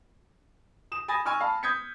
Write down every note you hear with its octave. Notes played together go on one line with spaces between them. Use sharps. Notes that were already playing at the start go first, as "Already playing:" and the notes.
D#6 E7
G#5 B5 D#6 A6 A#6
G#5 C#6 E6 F6
F5 A5 B5
D#6 G6 G#6 B6 C#7